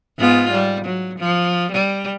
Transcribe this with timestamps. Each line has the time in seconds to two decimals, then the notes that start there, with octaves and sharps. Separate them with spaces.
0.19 G#2 B3 F4
0.51 G3
0.85 F#3
1.19 F3
1.72 G3